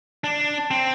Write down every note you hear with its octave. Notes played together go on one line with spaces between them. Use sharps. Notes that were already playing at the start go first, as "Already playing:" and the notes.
D4
C4